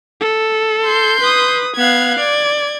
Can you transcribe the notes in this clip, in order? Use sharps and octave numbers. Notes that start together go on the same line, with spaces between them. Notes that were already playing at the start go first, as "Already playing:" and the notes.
A4
C6 G6
B4 D#6
B3 F5 F#6 G#6
D5 G#6